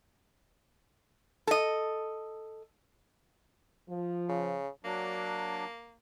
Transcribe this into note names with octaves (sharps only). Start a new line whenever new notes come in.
A4 D#5
F3
C#3
F#3 A#3 D4